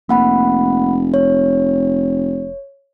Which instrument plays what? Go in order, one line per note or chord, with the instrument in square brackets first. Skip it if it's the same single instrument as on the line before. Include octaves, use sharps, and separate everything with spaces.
[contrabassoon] F1 [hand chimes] A#3 F#5 B5
[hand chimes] C#5